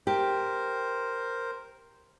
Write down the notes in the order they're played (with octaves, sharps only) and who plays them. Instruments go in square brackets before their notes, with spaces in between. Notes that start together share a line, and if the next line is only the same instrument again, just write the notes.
[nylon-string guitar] G4 [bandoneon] A#4 C5